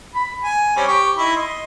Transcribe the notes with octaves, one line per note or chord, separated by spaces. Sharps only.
B5
G#5
G3 C4 C#4
G4 C#6
D#4 E4
D#5 C6